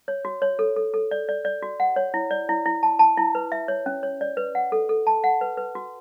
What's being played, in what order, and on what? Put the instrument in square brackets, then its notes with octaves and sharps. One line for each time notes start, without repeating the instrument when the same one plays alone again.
[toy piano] C#5
F#4
C#5
A4
A4
A4
D5
D5
D5
F#4
F#5
C#5
E4
D5
E4
E4
A5
A5
E4
B4
E5
C#5
C#4
C#5
D5
B4
F#5
A4
A4
A5
F#5
B4
B4
F#4